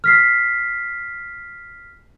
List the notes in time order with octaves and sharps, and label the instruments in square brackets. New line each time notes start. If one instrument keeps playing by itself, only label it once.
[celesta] F6 B6 C7